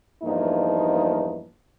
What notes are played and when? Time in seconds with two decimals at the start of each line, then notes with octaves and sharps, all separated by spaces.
0.24 E2 G2 F3 A#3 D#4